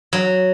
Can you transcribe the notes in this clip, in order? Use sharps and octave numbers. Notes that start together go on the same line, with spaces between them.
F#3